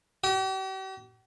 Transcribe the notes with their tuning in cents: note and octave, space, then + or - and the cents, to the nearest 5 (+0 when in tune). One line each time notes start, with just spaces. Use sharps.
G4 -45